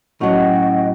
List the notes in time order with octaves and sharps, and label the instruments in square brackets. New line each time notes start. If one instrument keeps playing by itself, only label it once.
[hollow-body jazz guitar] A2 F#3 [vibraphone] C#4 F#5 [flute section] F#4 D#5 G5